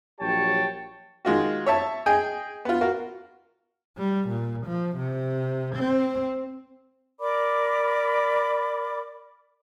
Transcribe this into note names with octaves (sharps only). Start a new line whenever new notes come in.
A#1 F#3 G4 C#5 G5 A5
D#3 G#3 F4 F#4
C#5 E5 A5
G#4 D#5 G5 G#5
B3 F4
F#4 A#4 F5
G3
A#2
F3
C3
C4
A#4 D5 B5 D6